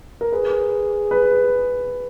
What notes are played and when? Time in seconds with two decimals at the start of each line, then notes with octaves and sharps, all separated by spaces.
0.21 A#4
0.32 G#4 B4
1.11 B4